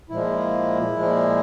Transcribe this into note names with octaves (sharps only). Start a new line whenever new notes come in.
A#2 F3 G#3 E4
A#2 F3 G#3